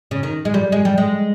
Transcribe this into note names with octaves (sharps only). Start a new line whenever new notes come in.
C#3
D#3
G#3
G3
G#3
G3
G#3